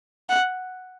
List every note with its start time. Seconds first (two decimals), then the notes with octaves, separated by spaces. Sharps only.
0.29 F#5